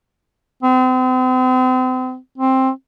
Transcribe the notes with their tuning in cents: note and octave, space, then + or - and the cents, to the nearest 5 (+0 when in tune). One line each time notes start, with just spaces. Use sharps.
C4 -40
C4 +10